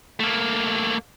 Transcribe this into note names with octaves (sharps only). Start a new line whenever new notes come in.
A3 A#3